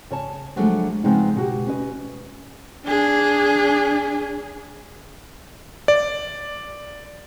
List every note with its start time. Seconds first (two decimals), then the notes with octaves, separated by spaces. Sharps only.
0.11 C#3 C#5 A5
0.56 F3 F#3 G#3 A3 D4
1.04 C#3 F3 G#3 B3 C4 D#4
1.36 B2 F#4 G4
1.67 C#4 B4 D#5
2.86 D4 G#4
5.88 D5